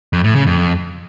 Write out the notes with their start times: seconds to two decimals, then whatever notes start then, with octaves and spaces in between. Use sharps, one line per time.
0.13 F2
0.24 A2
0.35 C#3
0.47 F2